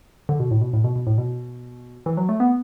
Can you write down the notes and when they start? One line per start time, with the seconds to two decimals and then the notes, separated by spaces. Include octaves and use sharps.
0.29 D3
0.40 B2
0.51 A2
0.61 B2
0.73 A2
0.84 B2
0.96 B2
1.07 A2
1.18 B2
2.06 E3
2.17 F#3
2.29 A3
2.40 B3